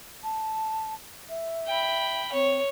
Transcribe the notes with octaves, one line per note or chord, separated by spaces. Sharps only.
A5
E5
G5 B5
C4 C#5